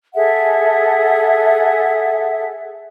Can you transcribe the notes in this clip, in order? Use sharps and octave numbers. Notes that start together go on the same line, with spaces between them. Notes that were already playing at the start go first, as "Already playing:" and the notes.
G#4 A4 E5 F#5